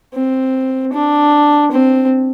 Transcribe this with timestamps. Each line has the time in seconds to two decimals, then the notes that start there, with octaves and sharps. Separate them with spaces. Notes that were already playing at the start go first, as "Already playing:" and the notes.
0.14 C4
0.93 D4
1.71 C4